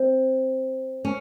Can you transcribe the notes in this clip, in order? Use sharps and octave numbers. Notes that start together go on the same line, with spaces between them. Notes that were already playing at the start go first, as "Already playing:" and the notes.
Already playing: C4
C#4